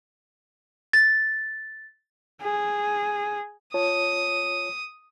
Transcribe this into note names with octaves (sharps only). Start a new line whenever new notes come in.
A6
G#4
F4 C#5 A5 D#6